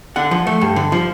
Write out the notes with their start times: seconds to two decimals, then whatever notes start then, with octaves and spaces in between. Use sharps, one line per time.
0.16 D3 F#5
0.31 F3
0.47 A3
0.61 G2
0.76 D3
0.92 F3